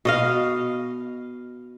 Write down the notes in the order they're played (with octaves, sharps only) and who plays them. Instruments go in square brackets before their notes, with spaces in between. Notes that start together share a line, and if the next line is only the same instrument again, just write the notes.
[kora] B2 D#5 F5